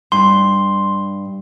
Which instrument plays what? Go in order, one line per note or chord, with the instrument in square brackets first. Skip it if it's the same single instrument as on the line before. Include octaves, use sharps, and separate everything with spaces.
[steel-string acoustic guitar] G2 [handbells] C6